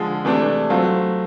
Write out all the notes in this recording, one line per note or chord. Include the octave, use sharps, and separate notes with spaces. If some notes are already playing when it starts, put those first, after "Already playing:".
Already playing: D3 F3 G#3
C3 E3 A3 D4
F#3 A3 C4 F4